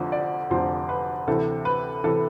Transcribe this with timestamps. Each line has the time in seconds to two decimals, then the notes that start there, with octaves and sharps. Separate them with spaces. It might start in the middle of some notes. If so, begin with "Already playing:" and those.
Already playing: F1 F2 D3 F3
0.12 D5
0.50 F1 F2 D3 F3 C5
0.89 B4
1.27 D2 C3 E3 A4
1.65 B4
2.04 C3 E3 A4